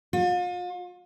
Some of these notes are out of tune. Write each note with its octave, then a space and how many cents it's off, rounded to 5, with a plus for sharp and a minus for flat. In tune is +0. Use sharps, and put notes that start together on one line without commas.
F4 +40